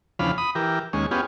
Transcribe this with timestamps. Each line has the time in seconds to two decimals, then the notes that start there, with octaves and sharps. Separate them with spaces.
0.19 E2 C#3 F3 D4 F5 B5
0.38 B5 D#6
0.55 E3 G4 A#4
0.93 D#2 G#3 C#4
1.11 B3 C#4 F4 G4 G#4